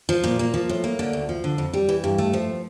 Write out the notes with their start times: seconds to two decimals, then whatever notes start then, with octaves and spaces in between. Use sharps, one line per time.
0.09 F3
0.24 A#2
0.39 A#3
0.54 F3
0.69 A2
0.84 A#3
0.99 D3
1.13 D2
1.29 F3
1.44 D3
1.58 F2
1.73 G3
1.89 E3
2.04 G2
2.18 A3
2.33 F3